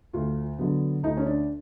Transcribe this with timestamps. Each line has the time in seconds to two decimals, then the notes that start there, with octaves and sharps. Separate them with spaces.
0.13 D2 F4
0.58 D3 F#3 B3
1.03 D2 D#4
1.17 C#4
1.26 D4